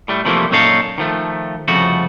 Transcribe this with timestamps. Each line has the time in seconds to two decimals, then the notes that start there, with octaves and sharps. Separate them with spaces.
0.08 A2 G3 A3
0.25 C3 E3 F3 G3 A3 A#3
0.51 F#2 A#2 C#4 D#4 A4 F5
0.98 D#3 F3 A3
1.68 C2 F2 C#3 F3 A3 F#4